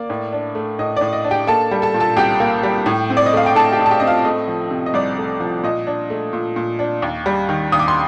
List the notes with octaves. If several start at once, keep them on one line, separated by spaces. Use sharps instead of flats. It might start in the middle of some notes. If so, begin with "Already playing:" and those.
Already playing: A#3 D5
A2
D4
A3
A2 D#5
A2 D5
D#5
D4
G4 G5
A#3 A4 A5
G3
A4 A5
A#2
A4 A5
C2 G4 G5
A#3
G3
A2
C4
D5
D#5
A3 F5
G5
A2 A4 A5
G4 G5
A2
A5
G4 G5
C4 D#5
F4 F5
A3 D#5
F3
C3
D#5
C2 D5
A3
F3
A#2 D#5
D4
A3
A#2
A#2
D4
D#2
G3
D#3
D#2 D#6
D6
C6